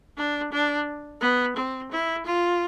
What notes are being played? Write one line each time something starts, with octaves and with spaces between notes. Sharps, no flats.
D4
D4
B3
C4
E4
F4